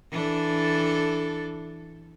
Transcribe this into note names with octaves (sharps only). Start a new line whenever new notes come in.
E3 D4 A4